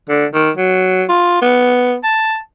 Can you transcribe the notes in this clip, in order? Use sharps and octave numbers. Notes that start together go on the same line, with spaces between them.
D3
D#3
F#3
F4
B3
A5